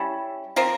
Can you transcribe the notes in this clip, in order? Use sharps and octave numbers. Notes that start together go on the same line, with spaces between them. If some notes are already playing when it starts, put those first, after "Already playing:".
Already playing: G3 C#4 E4
F3 C4 F4 A#4